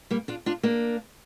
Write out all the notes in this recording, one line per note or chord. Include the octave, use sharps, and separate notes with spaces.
G3 A#3
D4 F4
D4 F4
A#3 D4